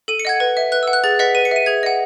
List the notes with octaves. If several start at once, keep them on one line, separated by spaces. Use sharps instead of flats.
A4 D#7
C#7
D#5 F#5 G#6
B4
E5
B4 F#6
E6
F#5
F#6
G#4 A6
B4 D#5 F#5 B6
B4 D#7
C#7
E5 D#7
G#4 G#6
D#5 F#5